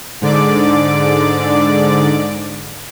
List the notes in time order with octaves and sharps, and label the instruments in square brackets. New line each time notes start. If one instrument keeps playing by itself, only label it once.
[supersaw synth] G#2 D3 D5 D6